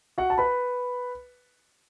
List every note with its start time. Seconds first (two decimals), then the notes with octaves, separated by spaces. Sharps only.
0.18 F#4 F#5
0.30 A5
0.38 B4 B5